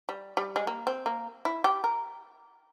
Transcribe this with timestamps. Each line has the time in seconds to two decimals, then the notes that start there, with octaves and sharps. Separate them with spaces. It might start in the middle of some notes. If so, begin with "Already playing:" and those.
0.09 G3
0.37 G3
0.56 G#3
0.67 A#3
0.87 C4
1.06 A#3
1.45 E4
1.64 G4
1.84 A#4